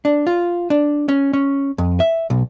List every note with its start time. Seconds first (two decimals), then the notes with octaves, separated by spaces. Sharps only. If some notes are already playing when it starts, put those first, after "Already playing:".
0.05 D4
0.27 F4
0.70 D4
1.09 C#4
1.33 C#4
1.78 F2
2.00 E5
2.30 B1